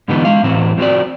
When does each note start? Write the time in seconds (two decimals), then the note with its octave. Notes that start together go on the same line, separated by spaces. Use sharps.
0.08 G#2 D3 E3 G3 B3 D#4
0.25 G#3 F5
0.44 A2 E3 C4
0.78 F3 G#3 C4 F#4 D5